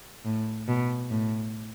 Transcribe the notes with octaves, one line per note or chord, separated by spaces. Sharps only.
A2
B2
A2